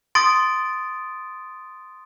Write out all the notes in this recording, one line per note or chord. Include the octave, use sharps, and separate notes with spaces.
C6 D#6 A6 D7